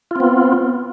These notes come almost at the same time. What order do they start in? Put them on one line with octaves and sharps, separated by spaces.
F4 C4 B3